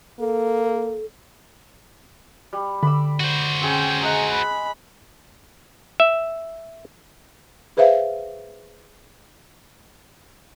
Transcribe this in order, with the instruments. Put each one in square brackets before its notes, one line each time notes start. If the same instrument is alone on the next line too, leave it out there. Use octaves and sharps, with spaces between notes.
[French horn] A#3 [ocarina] A4
[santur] G3
[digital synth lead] D3 [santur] B5 D6 E6
[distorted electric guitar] F#4 C5
[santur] C4 G#4 [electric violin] C#4 G5
[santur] G#3 F#5 [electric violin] A#5
[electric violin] B5
[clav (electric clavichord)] E5
[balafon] G#4 B4 C5 E5 F5